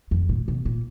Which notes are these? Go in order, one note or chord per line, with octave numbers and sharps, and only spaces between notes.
F2
A#2
B2
A#2